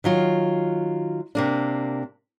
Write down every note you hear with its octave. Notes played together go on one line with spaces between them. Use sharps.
D#3 F#3 F4
C3 A#3 D4